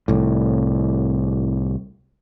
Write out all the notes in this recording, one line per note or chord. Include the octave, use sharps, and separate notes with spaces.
C2 A2